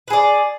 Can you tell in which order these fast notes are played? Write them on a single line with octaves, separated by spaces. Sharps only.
B4 G#4 D5